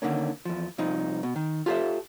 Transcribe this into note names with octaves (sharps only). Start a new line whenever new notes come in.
D3 D#3 A#3 C#4
E2 F3
C2 F3 D#4
B2
D#3
F4 G4 A4 B4 C5 E5